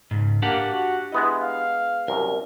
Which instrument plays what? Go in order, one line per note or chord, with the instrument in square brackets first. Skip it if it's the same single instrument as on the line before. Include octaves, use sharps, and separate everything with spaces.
[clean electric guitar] C#2 G#2
[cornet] A#3 [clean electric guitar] D4 G4 F#5
[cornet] F#4
[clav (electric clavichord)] G#3 B3 D#5 [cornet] E4
[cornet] F5
[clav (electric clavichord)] C2 F#2 [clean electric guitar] A#4